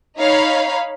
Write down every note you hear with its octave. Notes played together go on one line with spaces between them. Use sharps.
D#4 C#5 F5 B5